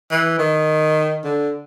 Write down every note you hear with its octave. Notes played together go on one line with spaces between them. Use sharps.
E3
D#3
D3